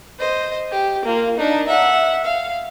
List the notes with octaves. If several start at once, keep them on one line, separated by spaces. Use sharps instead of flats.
C5 D#5
G4
A#3 F4
D4 D#4
E5 F#5
F5